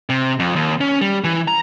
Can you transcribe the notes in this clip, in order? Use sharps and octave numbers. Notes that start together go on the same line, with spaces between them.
C3
F2
D#2
C#4
G3
E3
A#5